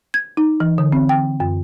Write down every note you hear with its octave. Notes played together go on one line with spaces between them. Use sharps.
G#6
D#4
E3
D3
C4
G5
F#2